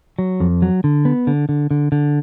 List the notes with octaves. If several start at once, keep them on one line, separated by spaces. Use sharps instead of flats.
F#3
F2
F#3
D3
B3
D3
D3
D3
D3